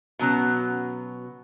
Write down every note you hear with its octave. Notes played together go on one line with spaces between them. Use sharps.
B2 F#3 C#4